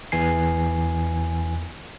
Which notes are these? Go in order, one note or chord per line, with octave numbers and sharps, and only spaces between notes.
E2 E3 G#5 C7